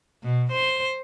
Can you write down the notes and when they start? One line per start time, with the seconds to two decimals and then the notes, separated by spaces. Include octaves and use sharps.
0.23 B2
0.52 C5